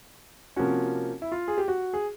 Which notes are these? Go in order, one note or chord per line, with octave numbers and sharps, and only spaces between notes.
C3 F3 A#3 C#4 F#4
E4
F4
G#4
G4
F#4
G#4